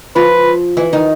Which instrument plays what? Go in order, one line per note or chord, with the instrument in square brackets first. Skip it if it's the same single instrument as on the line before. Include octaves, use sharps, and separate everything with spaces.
[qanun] F3 F4 [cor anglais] B4
[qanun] E3 E4
D#3 D#4